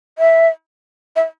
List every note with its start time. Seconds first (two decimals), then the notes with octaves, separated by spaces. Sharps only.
0.18 E5
1.16 E5